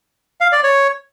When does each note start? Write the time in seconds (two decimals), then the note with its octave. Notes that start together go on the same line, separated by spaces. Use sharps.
0.41 F5
0.52 D5
0.64 C#5